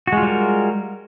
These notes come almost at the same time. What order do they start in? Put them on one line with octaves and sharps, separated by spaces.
F#4 G#3 F4 G3 A#4